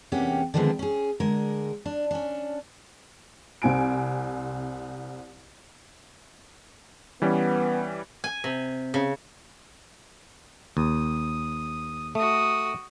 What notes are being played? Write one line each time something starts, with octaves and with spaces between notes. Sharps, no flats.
E2 C3 A#3 C#4 G4 F#5
D3 D#3 F3 G#3 B3 C4
C#4 G#4
D3 G#3 A#4
D4
C#4 D4
C2 C4 G#5 D7
E3 G3 B3 C#4
G#5
C3
C#3
D#2 D#6
A3 F#4 D#6